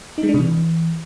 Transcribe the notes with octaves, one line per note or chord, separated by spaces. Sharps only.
D#4
G#3
D4
C3
E3